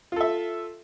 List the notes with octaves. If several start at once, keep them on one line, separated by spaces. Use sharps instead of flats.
F4 A4 E5